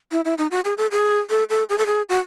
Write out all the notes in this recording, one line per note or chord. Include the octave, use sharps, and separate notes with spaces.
E4
E4
D#4
F#4
G#4
A4
G#4
A4
A4
G#4
A4
G#4
F#4